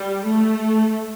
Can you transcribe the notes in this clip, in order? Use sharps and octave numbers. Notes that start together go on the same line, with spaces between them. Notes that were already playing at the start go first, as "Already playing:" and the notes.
Already playing: G3
A3